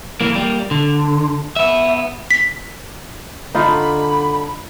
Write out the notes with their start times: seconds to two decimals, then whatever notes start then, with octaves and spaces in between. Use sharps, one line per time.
0.21 E3 A#3
0.35 G3 A#3
0.71 D3
1.56 B3 E5
2.31 B6
3.55 D3 D#4 F4 B5